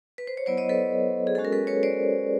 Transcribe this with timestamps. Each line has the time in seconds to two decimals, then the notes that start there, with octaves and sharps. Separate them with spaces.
0.18 B4
0.27 C5
0.37 C#5
0.46 F#3 B3 E4 C5 D5
0.57 C#5 D#5
0.69 A4 B4
1.27 G#4
1.35 G#3 C#4 F#4 A4
1.45 A#4
1.52 A4 B4
1.67 B4 C#5
1.83 C5 D5